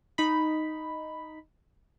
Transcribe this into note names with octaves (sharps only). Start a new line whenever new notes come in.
D#4 B5